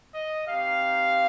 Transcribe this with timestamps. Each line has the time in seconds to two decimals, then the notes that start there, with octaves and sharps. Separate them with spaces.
0.14 D#5
0.47 C4 D#4 G4 F5